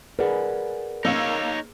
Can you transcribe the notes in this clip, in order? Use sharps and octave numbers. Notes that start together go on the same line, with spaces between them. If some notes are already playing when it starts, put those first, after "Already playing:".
G#4 A#4 B4 D5 F#5
A#3 D#4 C#5 E6 C#7